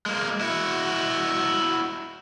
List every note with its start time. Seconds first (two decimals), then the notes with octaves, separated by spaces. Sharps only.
0.06 G#3 A#3
0.41 E4 F#4